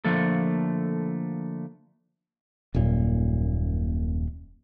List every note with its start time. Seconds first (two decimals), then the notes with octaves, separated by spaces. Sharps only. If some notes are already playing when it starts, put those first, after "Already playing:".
0.05 D3 F3 A3 A#3 A4
2.74 D#1 F#2 A#2